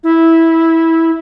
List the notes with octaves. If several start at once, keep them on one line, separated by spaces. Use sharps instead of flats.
E4